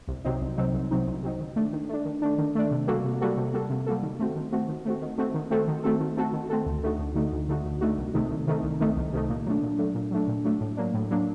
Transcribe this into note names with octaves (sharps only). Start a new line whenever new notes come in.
C2
C3 F#3 C4 D#4
C2
C3 F#3 C4 D#4
C2
C3 F#3 C4 D#4
C2
C3 F#3 C4 D#4
D#3
A3 D4
D#3
A3 D4
D#3
A3 D4
D#3
A3 D4
C3
G3 A#3 F#4 A4
C3
G3 A#3 F#4 A4
C3
G3 A#3 F#4 A4
C3
G3 A#3 F#4 A4
D#3
A3 C4 F#4
D#3
A3 C4 F#4
D#3
A3 C4 F#4
D#3
A3 C4 F#4
D#3
A3 C4 F#4 A4
D#3
A3 C4 F#4 A4
D#3
A3 C4 F#4 A4
D#3
A3 C4 F#4 A4
D2
D3 A3 D#4 F#4
D2
D3 A3 D#4 F#4
D2
D3 A3 D#4 F#4
D2
D3 A3 D#4 F#4
C2
C3 D#3 A3 D#4
C2
C3 D#3 A3 D#4
C2
C3 D#3 A3 D#4
C2
C3 D#3 A3 D#4
A#2
F#3 A3 D4
A#2
F#3 A3 D4
A#2
F#3 A3 D4
A#2
F#3 A3 D4
A2
F#3 A#3 D4
A2
F#3 A#3 D4